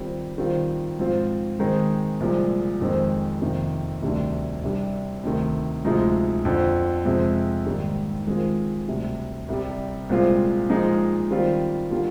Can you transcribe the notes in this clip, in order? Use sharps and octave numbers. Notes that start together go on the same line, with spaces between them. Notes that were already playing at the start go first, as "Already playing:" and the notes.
Already playing: D#3 G3 C4 F4
D#3 G3 C4 F4
G#2 F3 C4 F4
D#3 G#3 C4 D#4
C2 A#2 F3 G#3
F2 D#3 G#3 C4
F2 C3 D#3 A#3
D2 C3 D#3 G3 D4
C2 C3 G3 D4
D2 C3 D#3
D2 C3 F3 G#3 D#4
F2 D3 F3
F2 C3 F3 G#3 C4
G#2 D#3 G3 A#3
D#3 G#3 C4 F4 A#4
D2 C3 G3
C2 C3 G3
C2 A#2 G#3 C4 F4
A#2 F3 G#3 D#4
D#3 G3 C4 F4
D3 G3 A#3 F4